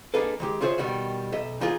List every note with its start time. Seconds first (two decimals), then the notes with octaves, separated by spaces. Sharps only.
0.14 A#3 D4 D#4 G#4 A4 B4
0.40 D#3 G#3 G4
0.61 E4 F4 G#4 C5 C#5 E5
0.78 B2 D#3 G3 F#4
1.32 B1 D#5 E5
1.60 E3 D#4 F4 G#4